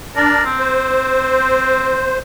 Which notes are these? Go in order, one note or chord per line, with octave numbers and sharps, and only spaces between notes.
D4 A#4 D5
C4
C5